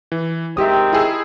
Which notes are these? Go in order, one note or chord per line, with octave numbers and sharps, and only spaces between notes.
E3
D#3 G#3 C4 G4 E5 D#6
E4 G#4 E6